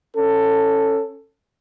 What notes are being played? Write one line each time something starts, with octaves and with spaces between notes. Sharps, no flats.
C#4 A4